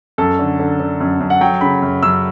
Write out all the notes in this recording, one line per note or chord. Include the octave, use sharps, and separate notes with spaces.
F#2 A4
D3
D3
D3
F#2
F#2
F#5
F#3 G5
C#3 B5
F#2
F#2 E6